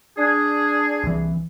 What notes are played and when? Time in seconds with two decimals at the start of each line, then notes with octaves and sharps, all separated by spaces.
0.18 D4 G#4
1.03 C2 E3